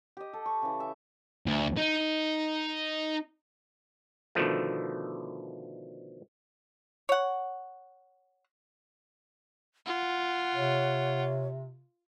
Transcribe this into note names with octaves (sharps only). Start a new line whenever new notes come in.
G4 D#5
A4
C#6
C#3 E3
E5
D2
D#4
B2 D3 D#3 F3 A3
C#5 F#5
F4 F#5
C3 C#5